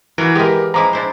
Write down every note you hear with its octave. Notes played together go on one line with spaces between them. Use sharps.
E3 F#4 A#4
E3 G#3 G4 A#4
F3 G#3 E4 A#5 D6
D4 E4 C5